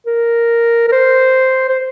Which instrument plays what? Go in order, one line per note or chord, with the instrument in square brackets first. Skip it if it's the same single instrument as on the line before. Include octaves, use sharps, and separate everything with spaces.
[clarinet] A#4
A#4
C5
C5